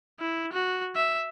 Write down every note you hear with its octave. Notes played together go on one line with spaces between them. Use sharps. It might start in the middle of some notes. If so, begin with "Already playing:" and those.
E4
F#4
E5